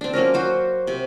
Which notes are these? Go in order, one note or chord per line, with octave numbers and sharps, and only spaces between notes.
C4 D4
F#3 A#3 C#4 A#4
F#4 C5
C3